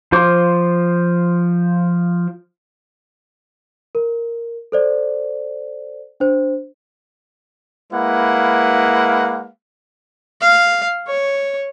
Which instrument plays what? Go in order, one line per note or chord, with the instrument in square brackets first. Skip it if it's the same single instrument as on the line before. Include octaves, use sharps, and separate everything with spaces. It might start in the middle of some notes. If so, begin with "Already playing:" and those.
[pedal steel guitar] F3 F4 C5 D6
[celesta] A#4
A4 C5 D5
D4 C5
[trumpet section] G#3 A#3 E4 B4 F5 F#5
[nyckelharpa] F5
C#5